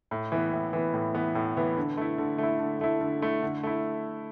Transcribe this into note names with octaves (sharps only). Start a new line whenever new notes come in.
A2
E3 B3
A2
E3 B3
A2
E3 B3
A2
E3 B3
D3
A3 E4
D3
A3 E4
D3
A3 E4
D3
A3 E4
D3
A3 E4